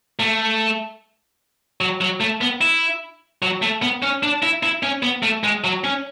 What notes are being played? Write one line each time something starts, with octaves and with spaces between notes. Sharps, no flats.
A3
F#3
F#3
A3
B3
E4
F#3
A3
B3
C#4
D4
E4
E4
C#4
B3
A3
G#3
F#3
C#4